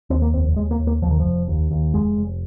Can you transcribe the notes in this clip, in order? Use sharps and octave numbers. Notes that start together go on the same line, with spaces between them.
D#2 C4
A#3
F1 C4
D#2 G#3
A#3
D#2
A#3
D#2 F3
D#3
F1 F3
D#2
D#2
F1 G#3
F1